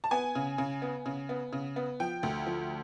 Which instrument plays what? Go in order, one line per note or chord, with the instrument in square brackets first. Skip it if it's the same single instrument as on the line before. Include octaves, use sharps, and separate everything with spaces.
[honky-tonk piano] A5
B3 G#5
C#3
C#3
B3
C#3
B3
C#3
B3
F3 G5
D2
F3